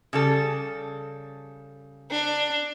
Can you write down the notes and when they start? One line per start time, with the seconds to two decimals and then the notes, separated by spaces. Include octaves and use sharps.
0.13 C#3 G3 A4
2.11 D4